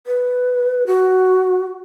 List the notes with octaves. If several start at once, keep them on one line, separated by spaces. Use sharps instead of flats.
B4
F#4